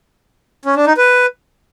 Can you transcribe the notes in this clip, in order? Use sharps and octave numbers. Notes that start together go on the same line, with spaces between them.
C#4
D4
D#4
B4